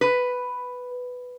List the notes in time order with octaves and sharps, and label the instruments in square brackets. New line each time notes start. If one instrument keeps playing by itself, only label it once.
[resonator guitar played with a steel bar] B4